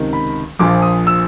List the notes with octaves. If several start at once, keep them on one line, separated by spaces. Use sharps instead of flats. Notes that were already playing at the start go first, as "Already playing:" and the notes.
Already playing: C#2 C3 D#3
B5
A#1 A#2 F3 D6
D#6
E6